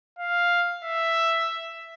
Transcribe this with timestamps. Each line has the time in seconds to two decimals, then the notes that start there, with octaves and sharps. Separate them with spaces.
0.19 F5
0.84 E5